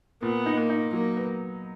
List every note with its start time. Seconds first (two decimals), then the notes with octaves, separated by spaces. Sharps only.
0.22 A#2 B3
0.46 D#4
0.58 A#3
0.70 D#4
0.93 F#3 A#3
1.17 B3